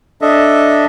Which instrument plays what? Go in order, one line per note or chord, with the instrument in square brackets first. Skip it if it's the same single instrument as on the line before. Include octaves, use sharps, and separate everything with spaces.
[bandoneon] D4 A4 D#5 E5